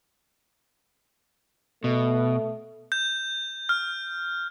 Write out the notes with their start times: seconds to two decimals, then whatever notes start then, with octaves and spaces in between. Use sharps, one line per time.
1.84 B2 A3
2.92 G6
3.69 F6